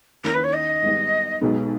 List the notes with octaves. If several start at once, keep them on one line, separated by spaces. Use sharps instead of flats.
D#2 D#3 A#3 C#4 E4 A#4
B4
C#5
D#5
G#1 G#2 G3 B3
B1 B2 G#3 B3 D#4